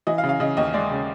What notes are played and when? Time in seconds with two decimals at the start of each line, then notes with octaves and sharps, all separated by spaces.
0.07 E3 D#5
0.18 F5
0.24 C#3
0.29 F5
0.40 C#3 D#5
0.57 D#2 D#5
0.74 G#3 D5
0.91 C#3